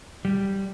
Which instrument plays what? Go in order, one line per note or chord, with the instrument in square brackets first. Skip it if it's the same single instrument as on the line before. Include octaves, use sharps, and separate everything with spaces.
[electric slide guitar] G3